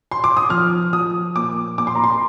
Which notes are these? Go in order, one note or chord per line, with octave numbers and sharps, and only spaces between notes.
C6
D6
D#6
F3 F6
F3 D#6
A#2 D6
A#2 D6
C6
A#5
C6